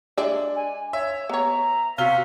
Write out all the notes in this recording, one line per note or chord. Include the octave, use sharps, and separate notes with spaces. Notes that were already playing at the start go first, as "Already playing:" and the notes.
G#3 D4 D5 E5
G#5
C#5 E5
B3 C#5 A#5
C3 F#4 F5 F6 G7